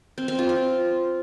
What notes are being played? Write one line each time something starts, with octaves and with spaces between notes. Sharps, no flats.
C4
C4
F4
F4